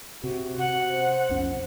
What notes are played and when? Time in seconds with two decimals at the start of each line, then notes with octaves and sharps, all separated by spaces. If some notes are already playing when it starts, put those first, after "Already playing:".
0.24 C3 F#4
0.58 C3 F#5
0.91 C5
1.29 B1 F2 C#4